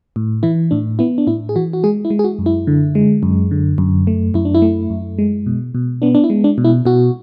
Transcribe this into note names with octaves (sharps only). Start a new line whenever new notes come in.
A2
E3 E4
A2 D4
B3 E4
D4
A2 E4
G#4
E3 F#4
F#4
G#3 G#4
E4
G#3
G#4
F#4
F#2
E4
D3
G#3
F#2
D3
F#2
A3
F#2 E4
D4
E4
A3
F#2
G#3
B2
B2
B3 D4
D4
E4
G#3
D4
B2
E4
B2 F#4